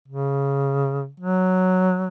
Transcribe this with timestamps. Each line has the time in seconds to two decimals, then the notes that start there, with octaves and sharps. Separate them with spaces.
0.08 C#3
1.20 F#3